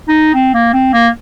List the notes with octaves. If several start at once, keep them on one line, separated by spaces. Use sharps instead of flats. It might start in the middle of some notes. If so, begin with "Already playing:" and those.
D#4
C4
A#3
C4
A#3